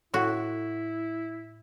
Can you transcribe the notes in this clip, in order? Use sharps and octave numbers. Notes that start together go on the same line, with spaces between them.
A2 E4 F#4